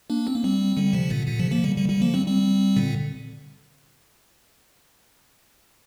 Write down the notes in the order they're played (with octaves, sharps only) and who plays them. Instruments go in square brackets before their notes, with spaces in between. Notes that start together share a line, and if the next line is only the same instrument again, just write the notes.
[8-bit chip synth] A#3 D4
C4
A#3
G3 C4
D3 G3
C3 F3
A#2 D3
A#2 D3
C3 F3
F3 A#3
D3 G3
D3 G3
D3 G3
F3 A#3
G3 C4
G3 C4
A#2 D3